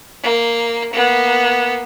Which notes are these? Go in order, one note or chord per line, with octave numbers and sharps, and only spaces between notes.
A#3
A#3 B3